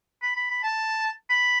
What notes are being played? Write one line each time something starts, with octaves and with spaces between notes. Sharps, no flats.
B5
B5
B5
A5
B5